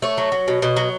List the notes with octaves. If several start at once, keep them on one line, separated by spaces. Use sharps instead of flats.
A3 C#5
F#3
F#3
B2
B2
F#3